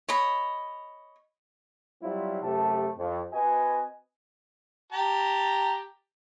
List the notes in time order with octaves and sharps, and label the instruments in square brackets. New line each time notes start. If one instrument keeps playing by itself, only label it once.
[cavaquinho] C#5 D#5 B5
[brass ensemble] F#3 G3 C4 E4 F4
F#2 C3 A3 G4 A5
F2
C4 F#4 B4 D#5 G#5
[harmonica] G4 A5 A#5